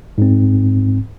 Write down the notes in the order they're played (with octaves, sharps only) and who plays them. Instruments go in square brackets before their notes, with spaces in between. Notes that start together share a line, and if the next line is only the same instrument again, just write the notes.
[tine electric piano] G#2 C4